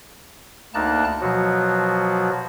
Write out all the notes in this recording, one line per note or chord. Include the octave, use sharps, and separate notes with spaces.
D2 A#3 D#4 A5 F#6
B2 F3 F#3 F#4